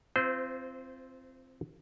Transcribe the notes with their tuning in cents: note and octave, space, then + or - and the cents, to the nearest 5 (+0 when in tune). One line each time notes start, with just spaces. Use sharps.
C4 +0 F4 -25 C5 -30